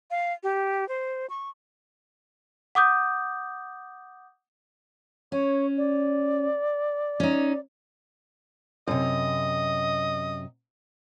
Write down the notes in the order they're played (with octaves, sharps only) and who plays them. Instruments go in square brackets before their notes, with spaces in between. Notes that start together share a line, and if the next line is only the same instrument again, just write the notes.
[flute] F5
G4
C5
C#6
[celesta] F#5 D6 D#6 G6
[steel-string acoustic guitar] C#4 [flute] C#5
[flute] D5
[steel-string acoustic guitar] C#4 D#4
[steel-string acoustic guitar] F#2 C3 [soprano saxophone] D#5